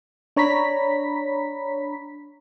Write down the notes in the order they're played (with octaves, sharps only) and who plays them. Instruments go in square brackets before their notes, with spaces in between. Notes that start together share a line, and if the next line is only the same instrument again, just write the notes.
[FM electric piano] D4 C#5 A#5 B5 B6